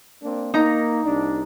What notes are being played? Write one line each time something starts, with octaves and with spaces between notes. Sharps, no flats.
A#3 C4 D4
A#3 D#4 A#5
C2 D4